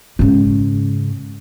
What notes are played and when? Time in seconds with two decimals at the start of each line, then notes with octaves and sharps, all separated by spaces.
0.19 G#2 C#3